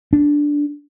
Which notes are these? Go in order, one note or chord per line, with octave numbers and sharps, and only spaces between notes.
D4